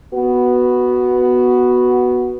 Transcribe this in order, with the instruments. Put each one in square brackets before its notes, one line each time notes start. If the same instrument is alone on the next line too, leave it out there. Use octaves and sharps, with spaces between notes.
[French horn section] B3 F#4